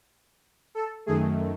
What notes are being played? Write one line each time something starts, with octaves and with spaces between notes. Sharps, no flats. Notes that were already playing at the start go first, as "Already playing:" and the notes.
A4
F#2 D#3 A3 G#4